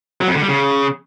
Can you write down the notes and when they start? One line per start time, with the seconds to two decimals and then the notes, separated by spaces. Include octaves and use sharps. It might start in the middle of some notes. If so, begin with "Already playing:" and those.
0.21 F#3
0.28 F2
0.35 D3
0.42 G3
0.49 C#3